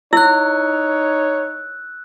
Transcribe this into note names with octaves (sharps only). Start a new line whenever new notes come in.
D#4 E4 C#5 E6 F#6